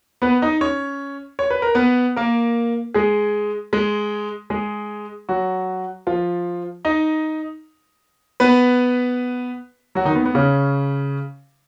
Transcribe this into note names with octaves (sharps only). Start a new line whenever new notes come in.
B3 B4
D#4 D#5
C#4 C#5
C#5
B4
A#4
B3 B4
A#3 A#4
G#3 G#4
G#3 G#4
G#3 G#4
F#3 F#4
F3 F4
D#4 D#5
B3 B4
F#3 F#4
D#3 D#4
B3
B3
C#3 C#4